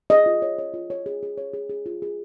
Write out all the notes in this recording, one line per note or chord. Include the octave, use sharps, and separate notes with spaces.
G#4 D#5
F4
C#5
C#5
F4
C#5
G#4
G#4
C#5
G#4
G#4
F4
G#4